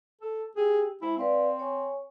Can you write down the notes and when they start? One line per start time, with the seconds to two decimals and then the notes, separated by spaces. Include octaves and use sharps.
0.21 A4
0.56 G4 G#4 G5 E6
1.02 G#3 E4 C5 E5
1.18 C4 B4 D5 F5
1.59 C#5 G#5 C#6